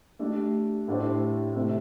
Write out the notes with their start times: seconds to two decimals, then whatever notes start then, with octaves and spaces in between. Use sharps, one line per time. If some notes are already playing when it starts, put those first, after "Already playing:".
0.19 A3 D4 G4
0.88 A2 A3 D4 G4 C5
1.56 C3 A3 C4